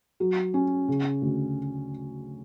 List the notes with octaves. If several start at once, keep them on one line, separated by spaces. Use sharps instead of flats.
F#3
C#4
C#3
D2